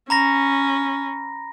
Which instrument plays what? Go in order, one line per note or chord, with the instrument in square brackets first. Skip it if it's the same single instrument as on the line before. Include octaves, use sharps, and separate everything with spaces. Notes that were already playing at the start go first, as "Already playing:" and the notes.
[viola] C#4 [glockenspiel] A#5 B5 A#6